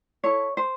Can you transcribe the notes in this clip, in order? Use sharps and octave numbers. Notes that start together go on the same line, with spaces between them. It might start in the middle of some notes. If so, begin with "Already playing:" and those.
E4 A4 C#5
C5